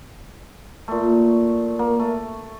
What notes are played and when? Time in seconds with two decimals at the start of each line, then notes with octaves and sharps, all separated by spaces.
0.88 A#2 A3
1.79 A#3
2.00 A3